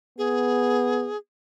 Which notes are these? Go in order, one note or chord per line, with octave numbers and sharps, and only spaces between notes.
B3 G#4